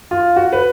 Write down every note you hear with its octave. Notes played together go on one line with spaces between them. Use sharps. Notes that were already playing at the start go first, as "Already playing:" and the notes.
F4
F#4
B4